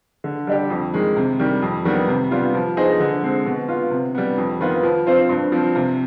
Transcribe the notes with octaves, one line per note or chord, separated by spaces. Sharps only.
D3
G3 D4 G4
F2
D#3 G#3
C3
D#3 G3
F2
D#3 G3 B3
C3
G3 B3 F4
F3
B3 D#4 G#4 C5
D3
G#3 C4
B2
B3 F4
C3
G3 B3
F2
D#3 B3 F4 B4
F3
C4 F4 C5
G2
F3 C4
C3